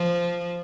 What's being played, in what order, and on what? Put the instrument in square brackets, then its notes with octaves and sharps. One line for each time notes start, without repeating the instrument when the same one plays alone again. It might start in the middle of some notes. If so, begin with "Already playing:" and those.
Already playing: [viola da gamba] F3